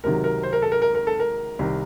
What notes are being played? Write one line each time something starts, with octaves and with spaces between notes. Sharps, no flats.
C#2 C3 D#3 F#3 A#4
A#4
C5
A#4
A4
A#4
A#4
A#4
A4
A#4
C2 C3 D#3